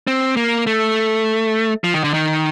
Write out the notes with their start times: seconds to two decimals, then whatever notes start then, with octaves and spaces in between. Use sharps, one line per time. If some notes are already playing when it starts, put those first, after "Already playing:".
0.07 C4
0.37 A#3
0.67 A3
1.84 F3
1.94 D#3
2.04 D3
2.14 D#3